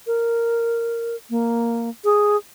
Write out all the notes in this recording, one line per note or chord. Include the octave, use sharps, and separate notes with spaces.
A#4
A#3
G#4